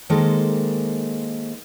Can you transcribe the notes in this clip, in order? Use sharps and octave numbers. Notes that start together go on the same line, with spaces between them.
D#3 G#3 A#3 A4 C5